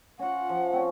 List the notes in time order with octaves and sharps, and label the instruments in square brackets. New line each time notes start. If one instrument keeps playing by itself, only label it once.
[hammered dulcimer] C#4 F4 [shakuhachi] F#5
[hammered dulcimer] F3
C4 C#4